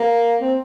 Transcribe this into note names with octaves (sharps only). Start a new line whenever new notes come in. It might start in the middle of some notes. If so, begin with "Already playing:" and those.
Already playing: A#3
C4